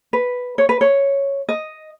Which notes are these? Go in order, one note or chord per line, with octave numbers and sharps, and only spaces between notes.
B4
C#5
B4
C#5
D#5